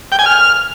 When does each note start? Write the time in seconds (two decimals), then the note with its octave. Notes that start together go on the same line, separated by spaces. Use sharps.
0.12 G5
0.19 G#5
0.26 F6